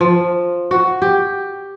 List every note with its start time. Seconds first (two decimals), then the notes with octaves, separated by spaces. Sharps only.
0.01 F3
0.71 F#4
1.02 G4